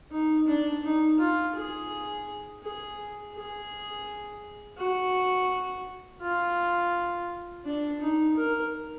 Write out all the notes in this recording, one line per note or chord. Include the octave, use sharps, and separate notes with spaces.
D#4
D4
D#4
F4
G#4
G#4
G#4
F#4
F4
D4
D#4
A#4